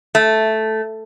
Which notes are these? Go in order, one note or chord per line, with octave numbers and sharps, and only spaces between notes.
A3